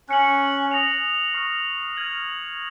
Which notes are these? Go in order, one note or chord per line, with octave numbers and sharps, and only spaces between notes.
C#4 F#6 C#7 F#7
D#6 A#6 C#7 F7
C#6 F6 C7
F6 G#6 D#7 F#7